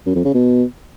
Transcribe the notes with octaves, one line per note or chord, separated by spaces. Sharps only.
F#2
F2
C#3
B2